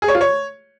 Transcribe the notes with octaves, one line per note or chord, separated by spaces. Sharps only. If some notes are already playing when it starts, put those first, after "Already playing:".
G#4
C#5
F4
C#5